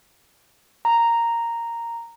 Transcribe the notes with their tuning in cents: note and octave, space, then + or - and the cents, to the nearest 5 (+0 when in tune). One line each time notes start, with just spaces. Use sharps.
A#5 -5